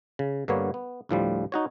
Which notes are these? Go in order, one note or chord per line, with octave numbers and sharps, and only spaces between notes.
C#3
G2 D3 A#3 B3 C#5
B3
D2 A2 F3 G3
D#4 F#4 C#5